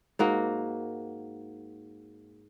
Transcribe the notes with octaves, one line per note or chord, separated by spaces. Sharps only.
G#2 A#3 F#4